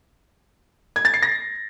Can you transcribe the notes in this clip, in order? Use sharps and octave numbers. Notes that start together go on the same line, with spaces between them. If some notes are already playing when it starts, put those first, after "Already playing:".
G#6
A6
C7
A#6